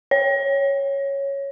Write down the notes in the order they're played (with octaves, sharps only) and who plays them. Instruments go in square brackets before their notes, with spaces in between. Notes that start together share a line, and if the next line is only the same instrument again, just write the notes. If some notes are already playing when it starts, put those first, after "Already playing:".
[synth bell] C#5